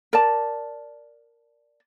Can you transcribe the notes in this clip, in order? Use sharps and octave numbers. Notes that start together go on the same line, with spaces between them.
A#4 D5 A5